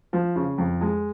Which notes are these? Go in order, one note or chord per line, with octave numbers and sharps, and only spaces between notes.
F3
C#3
F2
G#3